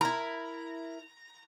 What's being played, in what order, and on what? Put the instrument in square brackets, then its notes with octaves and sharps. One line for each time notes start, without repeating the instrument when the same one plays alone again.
[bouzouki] E4 A#4 [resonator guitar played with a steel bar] A#5